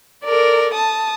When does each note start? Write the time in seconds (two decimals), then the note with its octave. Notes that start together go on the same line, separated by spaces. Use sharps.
0.24 A4 A#4 D5
0.74 A5 D#6